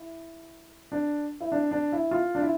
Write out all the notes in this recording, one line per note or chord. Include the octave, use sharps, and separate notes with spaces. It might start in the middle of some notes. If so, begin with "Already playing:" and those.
Already playing: E4
D4
E4
D4
D4
E4
F4
D4
E4